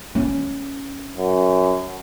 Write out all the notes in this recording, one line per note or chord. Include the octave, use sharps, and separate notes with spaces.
C#4
F#2